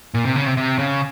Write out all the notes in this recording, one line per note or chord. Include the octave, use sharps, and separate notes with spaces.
A#2
C3
C#3
C3
C3
C#3